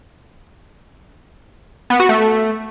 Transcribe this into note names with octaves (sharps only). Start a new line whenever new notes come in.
B3
F#4
A3